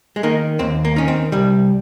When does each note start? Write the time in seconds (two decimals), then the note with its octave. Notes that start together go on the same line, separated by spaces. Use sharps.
0.16 G#3
0.23 D#3 A#3
0.59 D#2 C4
0.85 A#3
0.96 D#3 C#4
1.08 C4
1.32 C2 G3